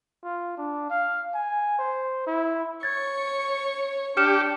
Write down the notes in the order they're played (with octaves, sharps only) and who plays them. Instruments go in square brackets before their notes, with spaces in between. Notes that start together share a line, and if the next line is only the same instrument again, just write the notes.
[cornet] F4
D4
F5
G#5
C5
E4
[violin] C#5 C#6 [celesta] G#6 A6
[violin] D4 [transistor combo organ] G4 [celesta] F6 C#7 E7